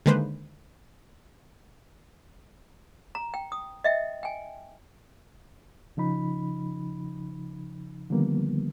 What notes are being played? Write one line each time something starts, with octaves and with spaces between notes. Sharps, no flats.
D3 D#3 G#3 A#3 B4 C5
A#5
G5
D#6
D#5 E5 G5
G5 G#5
C#3 F3 D#4 B5
D3 D#3 F3 G3 A#3 B3